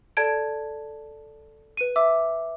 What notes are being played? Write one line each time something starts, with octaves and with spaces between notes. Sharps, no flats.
A4 D5 A5 G#6 D7
B4 D#7
E5 D6 E6